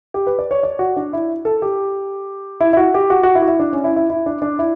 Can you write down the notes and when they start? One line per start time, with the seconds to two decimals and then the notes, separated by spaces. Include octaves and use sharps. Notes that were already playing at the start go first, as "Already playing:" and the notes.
0.14 G4
0.27 B4
0.39 D5
0.51 C#5
0.63 D5
0.79 F#4
0.96 D4
1.13 E4
1.45 A4
1.62 G4
2.61 E4
2.73 E4
2.77 F#4
2.94 G4
3.10 F#4
3.23 F#4
3.35 E4
3.42 F#4
3.48 E4
3.59 D4
3.73 C#4
3.84 E4
3.96 E4
4.10 E4
4.26 D4
4.42 D4
4.59 E4